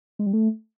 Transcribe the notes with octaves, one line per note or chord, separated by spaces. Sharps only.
G#3
G3
A3